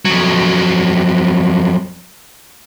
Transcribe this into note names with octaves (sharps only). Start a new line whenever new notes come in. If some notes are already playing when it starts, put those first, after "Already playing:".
F2 F#3